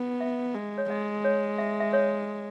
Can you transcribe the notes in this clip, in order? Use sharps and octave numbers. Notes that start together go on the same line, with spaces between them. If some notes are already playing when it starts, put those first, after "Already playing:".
Already playing: B3
E5
G#3
C#5
G#3 D#5
C#5
E5
E5
C#5